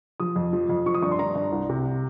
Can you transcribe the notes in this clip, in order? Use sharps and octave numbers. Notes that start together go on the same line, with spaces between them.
F3 D#6
F2
F3
F2
F3 C#6
D#6
G2 C#6
C6
G2 A#5
G2
C2
C3